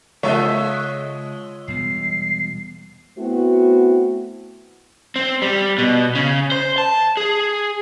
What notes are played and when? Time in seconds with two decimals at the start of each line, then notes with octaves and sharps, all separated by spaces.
0.23 C#3 G#3 F4 C#5 D#5 E5
1.68 E1 G3 B3 C7
3.18 A3 B3 C4 E4 F#4
5.16 C4
5.42 G3
5.78 B2
6.15 C#3
6.52 C5
6.78 A5
7.17 G#4